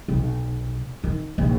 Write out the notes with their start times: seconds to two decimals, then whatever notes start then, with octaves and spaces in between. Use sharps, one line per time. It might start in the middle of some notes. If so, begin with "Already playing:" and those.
0.08 B1
1.04 D#3
1.38 A#1 D#2